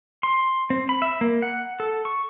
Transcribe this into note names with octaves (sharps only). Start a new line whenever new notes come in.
C6
C4
B5
E5
A#3
F#5
A4
C#6